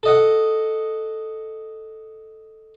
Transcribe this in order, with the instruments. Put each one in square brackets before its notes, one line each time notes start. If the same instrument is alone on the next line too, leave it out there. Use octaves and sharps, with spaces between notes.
[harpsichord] A4 D#5 F#5